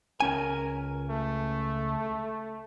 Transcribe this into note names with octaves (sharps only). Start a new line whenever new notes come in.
C#2 C#4 A#4 G#5
A3